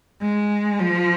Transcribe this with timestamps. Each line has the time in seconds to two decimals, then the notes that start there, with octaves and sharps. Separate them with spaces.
0.22 G#3
0.79 F3